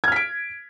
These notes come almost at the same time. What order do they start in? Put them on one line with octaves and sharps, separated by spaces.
G#6 F6 B6 D7